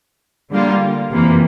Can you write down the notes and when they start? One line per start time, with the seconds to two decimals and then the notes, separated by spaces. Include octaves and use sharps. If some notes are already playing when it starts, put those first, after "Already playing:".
0.51 D3 G3 A#3 F4
1.11 F2 C3 E3 A#3